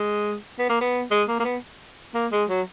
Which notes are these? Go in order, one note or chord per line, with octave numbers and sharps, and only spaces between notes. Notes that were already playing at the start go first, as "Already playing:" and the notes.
Already playing: G#3
B3
A#3
B3
G#3
A#3
A#3
B3
A#3
G#3
F#3